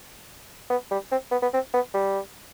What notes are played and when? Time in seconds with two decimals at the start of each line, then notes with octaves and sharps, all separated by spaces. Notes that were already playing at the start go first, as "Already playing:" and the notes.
0.70 B3
0.91 G3
1.11 C4
1.32 B3
1.42 B3
1.53 C4
1.74 B3
1.94 G3